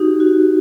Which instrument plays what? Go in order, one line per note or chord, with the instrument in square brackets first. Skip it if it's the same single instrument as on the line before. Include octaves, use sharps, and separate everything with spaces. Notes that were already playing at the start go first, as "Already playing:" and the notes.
Already playing: [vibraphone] D#4 F#4 G4
F#4